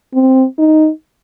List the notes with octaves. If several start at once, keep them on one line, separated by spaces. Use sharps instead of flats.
C4
D#4